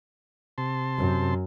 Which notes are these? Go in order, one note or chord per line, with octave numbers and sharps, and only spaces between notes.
C3 A5 C6
F#2